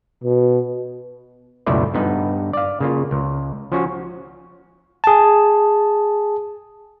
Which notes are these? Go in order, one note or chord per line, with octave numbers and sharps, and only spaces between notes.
B2
C#2 F#2 B2 A3 E4 D5
G2 B3 D#4
D5 F5
C#3 A#3 F4
C#2
F3 C#4 F#4
G#4 A5